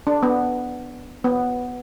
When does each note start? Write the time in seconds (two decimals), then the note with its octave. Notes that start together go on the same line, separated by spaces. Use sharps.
0.07 D4
0.23 B3
1.24 B3